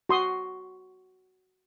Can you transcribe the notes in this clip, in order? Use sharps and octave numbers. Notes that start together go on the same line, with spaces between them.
F#4 C6 D#6